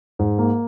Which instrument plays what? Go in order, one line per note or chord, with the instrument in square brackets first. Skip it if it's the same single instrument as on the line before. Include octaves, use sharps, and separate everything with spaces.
[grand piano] G#2
A#3